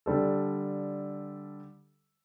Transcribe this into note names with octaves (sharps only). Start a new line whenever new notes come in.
D3 G3 A4